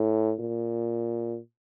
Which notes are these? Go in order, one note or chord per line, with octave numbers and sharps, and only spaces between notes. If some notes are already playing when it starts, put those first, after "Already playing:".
Already playing: A2
A#2